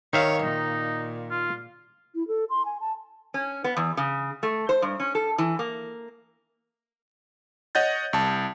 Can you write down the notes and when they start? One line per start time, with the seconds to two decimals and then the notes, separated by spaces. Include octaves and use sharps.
0.13 D#3 C#5 E5 F5
0.42 A#2 D#4
1.31 F4
2.15 E4
2.28 A4
2.50 C6
2.65 G#5
2.81 A5
3.34 C#4
3.64 B3
3.77 E2
3.97 C#3
4.43 A3
4.69 C5
4.82 G2
5.00 C#4
5.15 A4
5.38 E3
5.59 A#3
7.75 C#5 D#5 F#5 G6 A6
8.13 C2 A5